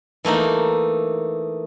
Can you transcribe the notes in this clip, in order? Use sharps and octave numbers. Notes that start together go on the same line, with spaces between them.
E3 A3 A#3 D#4